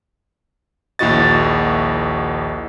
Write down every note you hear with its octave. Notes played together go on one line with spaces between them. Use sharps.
A#1 D#2 E4 F#4 D#5 A6